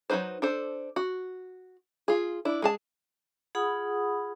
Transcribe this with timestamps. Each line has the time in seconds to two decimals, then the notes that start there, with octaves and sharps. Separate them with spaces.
0.10 F#3 A3 D#4 B4 C5
0.42 D4 A4 C5
0.96 F#4
2.08 F4 G#4
2.45 D4 E4
2.62 G#3 G#4 A5
3.55 F4 G#4 F#5 B5 D#6